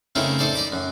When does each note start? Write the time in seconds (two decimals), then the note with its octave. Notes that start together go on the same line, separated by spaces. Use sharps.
0.15 C#3 A3 C4 D#4 E4 A#4
0.39 D#4 A4 C5 D5
0.54 D5 D#5 B5 D6
0.72 F#2